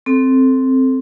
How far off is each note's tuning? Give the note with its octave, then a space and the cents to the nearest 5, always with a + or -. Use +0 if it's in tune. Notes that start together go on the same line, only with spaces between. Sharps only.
C4 +0 A4 +0